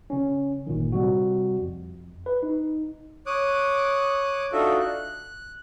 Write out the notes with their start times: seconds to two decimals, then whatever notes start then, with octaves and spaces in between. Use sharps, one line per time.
0.10 C#3 C#4
0.67 G1 A#2 D#3
0.92 C3 G3 C4 F#4
1.61 F2
2.26 B4
2.43 D#4
3.26 C#5 D6 D#6 F#6
4.52 D4 D#4 F4 F#4 A4 E5
4.80 F#6